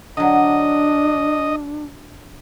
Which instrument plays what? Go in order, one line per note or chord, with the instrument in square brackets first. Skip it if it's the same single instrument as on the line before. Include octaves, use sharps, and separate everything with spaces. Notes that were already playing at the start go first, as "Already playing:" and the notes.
[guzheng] D3 F#3 [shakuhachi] D4 [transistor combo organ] D#5